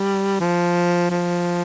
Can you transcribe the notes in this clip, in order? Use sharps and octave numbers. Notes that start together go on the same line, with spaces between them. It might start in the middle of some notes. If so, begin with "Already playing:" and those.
Already playing: G3
F3
F3